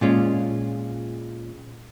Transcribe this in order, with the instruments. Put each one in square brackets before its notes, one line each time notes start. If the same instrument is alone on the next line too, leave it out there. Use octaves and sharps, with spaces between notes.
[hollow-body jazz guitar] A#2 G#3 C#4 F4